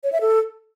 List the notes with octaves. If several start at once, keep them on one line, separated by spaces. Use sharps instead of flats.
C#5
E5
A4